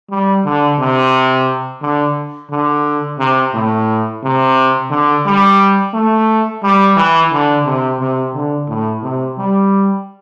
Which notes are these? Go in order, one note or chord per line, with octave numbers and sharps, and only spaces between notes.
G3
D3
C3
D3
D3
C3
A2
C3
D3
G3
A3
G3
E3
D3
C3
C3
D3
A2
C3
G3